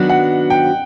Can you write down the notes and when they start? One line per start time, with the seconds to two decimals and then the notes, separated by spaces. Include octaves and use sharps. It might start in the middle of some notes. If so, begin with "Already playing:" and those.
Already playing: D#3 F#3 B3 D4 F#4
0.09 F#5
0.50 G5